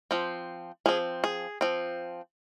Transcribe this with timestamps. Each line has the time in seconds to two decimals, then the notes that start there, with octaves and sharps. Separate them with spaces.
0.11 F3 C4
0.86 F3 C4 G#4
1.24 G#4
1.61 F3 C4